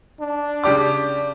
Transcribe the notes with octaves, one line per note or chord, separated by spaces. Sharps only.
D4
C#3 G4 D5 D6